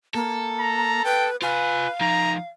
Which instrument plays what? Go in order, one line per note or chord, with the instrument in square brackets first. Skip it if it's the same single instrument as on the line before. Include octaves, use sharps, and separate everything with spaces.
[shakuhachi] A#3 [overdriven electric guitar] A4
[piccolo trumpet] A#5
[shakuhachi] B4 [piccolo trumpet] G5
[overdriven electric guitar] F4 G#5 [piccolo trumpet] B4 [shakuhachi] F5
[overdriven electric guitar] F3 D#4 [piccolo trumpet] A#5